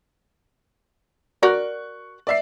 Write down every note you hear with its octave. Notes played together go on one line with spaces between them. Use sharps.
F#4 A#4 D5 C#6 F#6
D5 E5 C7